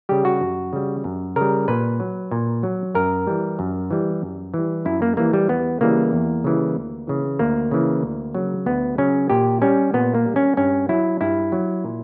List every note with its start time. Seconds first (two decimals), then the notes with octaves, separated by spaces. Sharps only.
0.09 C#3 G3 G4
0.25 F#4
0.41 F#2
0.73 C#3 G3
1.04 F#2
1.36 C#3 G3 A#4
1.68 A#2 B4
2.00 F#3
2.31 A#2
2.63 F#3
2.95 F#2 A#4
3.27 E3 G3
3.59 F#2
3.91 E3 G3
4.22 F#2
4.54 E3 G3
4.85 F#2 E4
5.02 A#3
5.17 E3 G3 A#3
5.33 G3
5.49 E2 B3
5.81 C#3 E3 G3 A#3
6.13 E2
6.44 C#3 E3 G3
6.76 D2
7.07 C#3 E3
7.39 D2 A#3
7.71 C#3 E3
8.03 D2
8.35 C#3 F#3
8.66 D2 B3
8.98 C#3 F#3 C#4
9.30 A#2 G4
9.62 G3 C#4
9.94 A#2 B3
10.15 A#3
10.25 G3
10.36 C#4
10.57 G2 C#4
10.89 F#3 E4
11.21 G2 E4
11.52 F#3
11.84 A#2